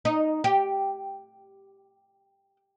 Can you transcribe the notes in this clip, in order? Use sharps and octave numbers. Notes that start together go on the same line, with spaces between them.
D#4
G4